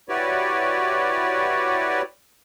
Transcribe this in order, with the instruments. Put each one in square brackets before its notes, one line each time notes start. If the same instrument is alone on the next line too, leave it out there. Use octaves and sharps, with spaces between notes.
[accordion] E4 F#4 G4 B4 C#5 D5